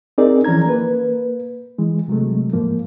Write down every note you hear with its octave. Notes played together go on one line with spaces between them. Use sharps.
C4 D#4 G#4 A#4 D5
E3 F3 C#4 A#5 G#6
A#3 B4
E3 G#3
C3 F#3 G#3 A3
G#2 F3 A#3